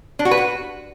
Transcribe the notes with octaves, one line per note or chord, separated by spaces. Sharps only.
D4
F#4
B4
F#4